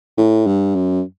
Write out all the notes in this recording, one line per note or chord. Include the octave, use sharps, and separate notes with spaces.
A2
G2
F#2